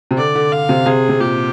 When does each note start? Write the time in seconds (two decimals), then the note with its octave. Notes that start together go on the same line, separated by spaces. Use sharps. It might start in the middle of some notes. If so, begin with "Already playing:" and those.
0.11 C3
0.17 D3 D5
0.35 D3
0.52 F5
0.69 C3
0.86 C3 G#4
1.09 C3
1.20 A#2 G4